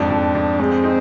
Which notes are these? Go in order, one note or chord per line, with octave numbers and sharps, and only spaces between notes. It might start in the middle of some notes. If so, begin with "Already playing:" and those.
Already playing: F2 G#2 D4
F2
F2
G#3 C4
D#4